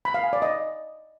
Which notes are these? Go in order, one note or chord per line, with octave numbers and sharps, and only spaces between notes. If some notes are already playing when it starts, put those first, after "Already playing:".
B5
F5
G#5
D5
D#5